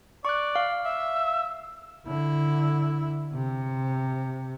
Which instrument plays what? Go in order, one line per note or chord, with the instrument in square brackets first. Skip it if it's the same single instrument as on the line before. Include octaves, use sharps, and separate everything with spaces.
[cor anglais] D5 [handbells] C#6 F#6
[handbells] F5
[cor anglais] E5 [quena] E6
[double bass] D3 E4
C3